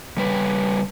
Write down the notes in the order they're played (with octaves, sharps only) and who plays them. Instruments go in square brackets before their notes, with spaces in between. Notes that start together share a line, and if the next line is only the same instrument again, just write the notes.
[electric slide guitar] C#3 G3 B4